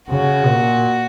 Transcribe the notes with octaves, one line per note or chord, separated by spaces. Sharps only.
C#3 F#4
A#2